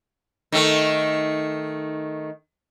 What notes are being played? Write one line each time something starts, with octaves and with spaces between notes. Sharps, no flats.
D#3 A3